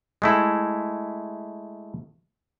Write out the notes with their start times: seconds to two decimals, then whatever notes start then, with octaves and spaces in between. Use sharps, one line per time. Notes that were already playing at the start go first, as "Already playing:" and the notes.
0.22 G#3 A3 E4